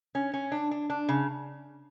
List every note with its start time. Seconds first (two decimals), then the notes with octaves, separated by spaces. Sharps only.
0.15 C#4
0.34 C#4
0.52 D4
0.71 D4
0.90 D4
1.09 C#3